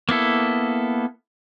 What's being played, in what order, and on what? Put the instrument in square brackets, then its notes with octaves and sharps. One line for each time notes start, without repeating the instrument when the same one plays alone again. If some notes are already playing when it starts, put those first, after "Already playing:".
[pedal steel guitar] A#3 B3 E4 A4